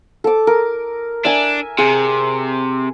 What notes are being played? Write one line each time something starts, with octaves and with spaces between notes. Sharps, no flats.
A4 D6
A#4
D4 E5 G#5
C3 G#4